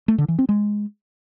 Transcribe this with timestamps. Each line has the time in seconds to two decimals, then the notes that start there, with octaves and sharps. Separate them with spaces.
0.08 A3
0.18 D3
0.28 E3
0.39 C4
0.49 G#3